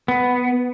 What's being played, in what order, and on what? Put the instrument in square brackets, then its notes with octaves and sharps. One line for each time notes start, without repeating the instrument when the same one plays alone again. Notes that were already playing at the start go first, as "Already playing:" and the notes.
[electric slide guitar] B3